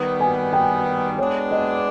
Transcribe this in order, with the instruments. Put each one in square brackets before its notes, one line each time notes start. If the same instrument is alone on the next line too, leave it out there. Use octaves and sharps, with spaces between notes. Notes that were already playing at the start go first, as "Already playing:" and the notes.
Already playing: [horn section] D#3 G3 B3
[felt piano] G#5
G5
[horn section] G#3 B3 D4 [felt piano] C#5
[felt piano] D#5